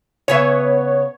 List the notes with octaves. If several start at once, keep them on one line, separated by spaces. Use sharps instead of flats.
C#3 B3 C#5 E5